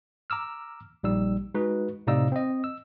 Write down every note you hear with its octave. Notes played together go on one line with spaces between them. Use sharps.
A#5 D6 E6 F6
A#1 G3 D#4 E6
G#3 D#4 F#4 B4
A2 C3 D#4 D5 F5 E6
C4 D#5
E6